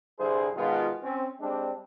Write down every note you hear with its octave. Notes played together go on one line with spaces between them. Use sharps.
C2 G2 D3 E4 G#4 C5
B2 D#3 G#3 B3 F4
C4 C#4
G3 G#3 C4 D4